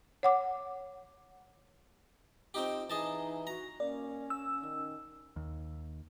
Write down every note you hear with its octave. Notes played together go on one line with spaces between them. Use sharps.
C#5 F#5 D6
C4 D#4 F4 G4
E3 D#4 G#4 D#5 A5
F#4 A#5
A#3 C#4 D5
E6
D#3
D#2